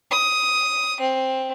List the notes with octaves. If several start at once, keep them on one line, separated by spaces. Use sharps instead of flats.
D#6
C4